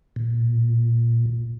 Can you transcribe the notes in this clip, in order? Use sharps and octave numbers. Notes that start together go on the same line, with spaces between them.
A#2